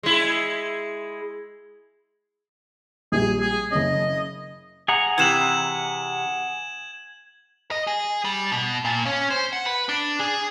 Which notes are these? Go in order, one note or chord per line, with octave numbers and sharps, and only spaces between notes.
G#3 E4
A#1 G3 G#4
G#4
F#1 C#4 D#5
G#4 F#5 A#5
C3 E3 G#6 E7 F#7
D#5
G#4
G3
B2
A#2
C#4
C5
F#5
B4
D4
G#4